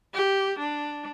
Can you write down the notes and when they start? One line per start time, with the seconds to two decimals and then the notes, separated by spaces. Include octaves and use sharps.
0.14 G4
0.59 D4